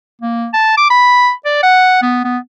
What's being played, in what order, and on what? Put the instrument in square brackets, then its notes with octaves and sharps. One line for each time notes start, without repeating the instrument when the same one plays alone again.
[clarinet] A#3
A5
D6
B5
D5
F#5
B3
B3